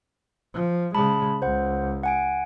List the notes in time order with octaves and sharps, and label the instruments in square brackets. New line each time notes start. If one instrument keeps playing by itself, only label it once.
[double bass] F3
[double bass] C#3 G#3 [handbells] A5 B5
[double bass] C#2 [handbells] C5 F#5
[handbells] F#5 G#5 D7